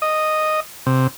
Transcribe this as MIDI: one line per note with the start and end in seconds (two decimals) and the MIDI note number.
0.02 0.60 75
0.86 1.07 48